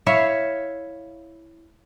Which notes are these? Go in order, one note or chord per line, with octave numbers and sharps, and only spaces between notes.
E4 C#5 E5 F5